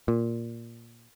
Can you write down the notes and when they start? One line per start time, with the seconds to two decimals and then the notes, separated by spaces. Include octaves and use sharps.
0.08 A#2